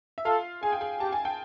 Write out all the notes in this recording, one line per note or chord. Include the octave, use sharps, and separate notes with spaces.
E5
F4 A4 F5
G#4 G#5
G5
G#4 G#5
G4 A5
G#5
G5